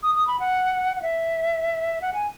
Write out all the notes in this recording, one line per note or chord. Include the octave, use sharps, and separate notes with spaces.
D#6
D#6
B5
F#5
F#5
E5
F#5
G#5